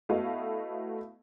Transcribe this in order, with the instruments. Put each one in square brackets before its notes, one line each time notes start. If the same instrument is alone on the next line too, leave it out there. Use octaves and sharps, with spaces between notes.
[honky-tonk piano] A3 B3 E4 F#4 D#5 F5